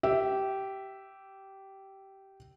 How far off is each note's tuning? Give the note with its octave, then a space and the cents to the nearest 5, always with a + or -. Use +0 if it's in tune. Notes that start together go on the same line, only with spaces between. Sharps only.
G4 -15 E5 +0